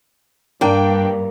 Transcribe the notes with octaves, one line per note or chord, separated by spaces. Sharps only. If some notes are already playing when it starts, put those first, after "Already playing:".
G2 A#3 D4 G5